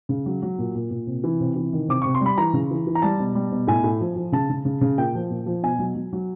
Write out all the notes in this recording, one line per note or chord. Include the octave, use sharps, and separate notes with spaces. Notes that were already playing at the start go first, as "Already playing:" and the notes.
C#3
F#3
F#3
A#2
A#2
A#2
C3
E3
C3
E3
D#3
C3 D6
C3 C#6
C6
G3
B5
E3 A#5
C#3
E3
E3
A#5
G3 A5
B2
G3
B2
A2 G#5
A2
F3
F3
C#3 A5
C#3
C#3
C#3
A#2 G5
F3
A#2
F3
B2 G#5
F#3
F#3
F#3